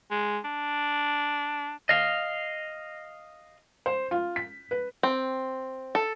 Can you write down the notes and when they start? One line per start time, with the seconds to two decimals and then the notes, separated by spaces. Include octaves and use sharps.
0.11 G#3
0.44 D4
1.89 D#5 F5
3.86 C5
4.11 F4
4.36 B6
4.71 B4
5.03 C4
5.95 A4